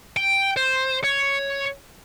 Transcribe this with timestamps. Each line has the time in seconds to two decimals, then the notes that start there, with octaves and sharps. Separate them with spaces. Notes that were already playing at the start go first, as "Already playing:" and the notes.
0.17 G5
0.57 C5
1.04 C#5